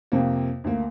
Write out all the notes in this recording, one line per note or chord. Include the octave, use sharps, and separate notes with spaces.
F2 C3 A#3
D2 A#3